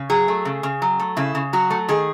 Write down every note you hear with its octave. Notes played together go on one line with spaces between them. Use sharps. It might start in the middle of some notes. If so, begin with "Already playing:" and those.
Already playing: C#3
F#3 G#4
A3
C#3
C#3
F#3
A3
C#3 E4
C#3
F#3 F#4
A3
D#3 G#4